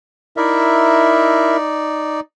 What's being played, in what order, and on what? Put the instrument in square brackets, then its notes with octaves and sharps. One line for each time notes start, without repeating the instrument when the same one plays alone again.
[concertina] D#4 D5 [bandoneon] E4 A#4 E5